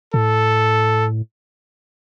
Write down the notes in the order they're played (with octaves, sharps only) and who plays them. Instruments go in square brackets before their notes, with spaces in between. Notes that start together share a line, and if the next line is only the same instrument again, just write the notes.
[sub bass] A2 [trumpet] A4